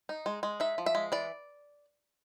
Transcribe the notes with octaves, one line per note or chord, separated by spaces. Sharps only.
D#4
G#3
G#3
D#4 E5
F3
E5
G#3
E3 D5